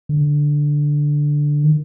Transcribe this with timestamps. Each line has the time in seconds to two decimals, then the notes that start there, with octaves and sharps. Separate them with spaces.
0.09 D3
1.64 D#3